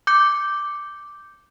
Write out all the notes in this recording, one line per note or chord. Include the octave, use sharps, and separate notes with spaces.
D6 G6 C#7